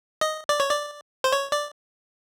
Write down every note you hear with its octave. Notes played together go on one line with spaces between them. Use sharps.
D#5
D5
C#5
D5
C5
C#5
D5